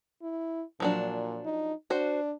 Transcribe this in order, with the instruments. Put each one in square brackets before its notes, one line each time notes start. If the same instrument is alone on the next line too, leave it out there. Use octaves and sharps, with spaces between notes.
[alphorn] E4
[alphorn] A#2 [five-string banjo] F3 F#3 D4
[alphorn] D#4
[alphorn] D4 [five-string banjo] F#4 C5